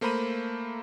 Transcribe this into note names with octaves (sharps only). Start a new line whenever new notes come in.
A3 A#3 C5 A#5 B5 D#7